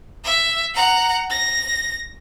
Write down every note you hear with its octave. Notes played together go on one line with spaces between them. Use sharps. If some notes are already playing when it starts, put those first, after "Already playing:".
E5
F#5 A#5
A#6